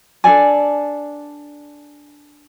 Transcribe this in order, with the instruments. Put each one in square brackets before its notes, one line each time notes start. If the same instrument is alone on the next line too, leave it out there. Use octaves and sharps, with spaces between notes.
[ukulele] D4 A4 D5 G#5